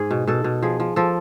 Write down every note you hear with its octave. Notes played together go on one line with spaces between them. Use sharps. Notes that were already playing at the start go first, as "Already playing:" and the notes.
Already playing: G#2 G#4
B2
B2 A4
B2
F3 G#4
F3
F3 A4